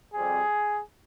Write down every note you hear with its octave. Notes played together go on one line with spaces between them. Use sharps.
F2 C3 G3 C4 G#4